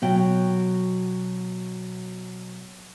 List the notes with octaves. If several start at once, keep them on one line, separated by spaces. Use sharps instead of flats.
B2 F#3 G5